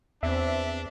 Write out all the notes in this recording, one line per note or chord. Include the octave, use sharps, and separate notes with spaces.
E2 C4 D4 E5